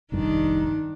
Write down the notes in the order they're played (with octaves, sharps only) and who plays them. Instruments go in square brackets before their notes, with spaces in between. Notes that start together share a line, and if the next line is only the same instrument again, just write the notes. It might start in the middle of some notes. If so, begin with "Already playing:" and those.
[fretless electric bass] F1 A#1 G2 [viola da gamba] D#3 D4 [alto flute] D#4